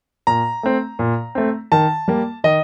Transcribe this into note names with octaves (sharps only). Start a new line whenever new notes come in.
A#2 A#5
A3 C4
A#2
A3 C4
D#3 A5
G3 A#3
D#3 D#5